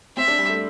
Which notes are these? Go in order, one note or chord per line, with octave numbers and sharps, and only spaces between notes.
C4 E5
D4
G3
A3